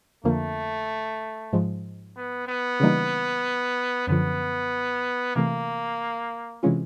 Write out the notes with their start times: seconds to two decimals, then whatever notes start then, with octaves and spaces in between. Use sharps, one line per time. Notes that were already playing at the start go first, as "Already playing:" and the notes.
0.24 F2 D3 F3 A3 A#3
1.53 G#2 F3 G#3
2.16 B3
2.48 B3
2.80 C#3 E3 G3 A#3 D#4
4.07 F#2 D3 F3 B3
5.35 C3 E3 A3 A#3
6.63 C3 E3 G#3 C#4 F4